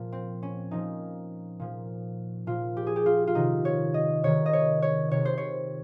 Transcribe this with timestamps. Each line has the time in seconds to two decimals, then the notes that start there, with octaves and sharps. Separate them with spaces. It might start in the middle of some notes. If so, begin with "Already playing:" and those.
Already playing: A#2 F3
0.12 C4
0.43 C#4
0.71 A#2 F3 D#4
1.60 A#2 F3
2.47 A#2 F3 F4
2.77 G4
2.87 G#4
2.96 G4
3.06 F4
3.27 F4
3.35 C3 D#3 D#4
3.65 C#5
3.94 D#5
4.23 C3 D#3 C#5
4.46 D#5
4.53 C#5
4.82 C#5
5.11 C3 D#3 C#5
5.25 C5
5.38 C#5